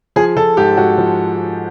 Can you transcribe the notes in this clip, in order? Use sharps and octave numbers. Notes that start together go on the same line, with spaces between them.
F3 G#4
F3 A4
G#2 G4
G#2 F#4
F3